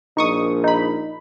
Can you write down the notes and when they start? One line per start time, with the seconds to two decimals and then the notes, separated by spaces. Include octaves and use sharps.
0.17 A#1 D#4 C#6 D#6
0.64 D#4 B5